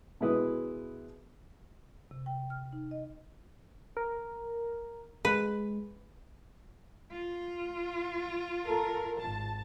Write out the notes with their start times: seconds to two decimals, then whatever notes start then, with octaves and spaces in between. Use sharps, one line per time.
0.21 B2 G#3 E4 B4 D#6
2.11 C3
2.26 G5
2.50 F6
2.73 D#4
2.91 D#5
3.97 A#4
5.25 G#3 B4
7.12 F4
8.66 A4 A#4
9.20 G#1 A5